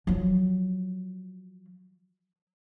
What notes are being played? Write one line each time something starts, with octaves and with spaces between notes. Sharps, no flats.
F3 F#3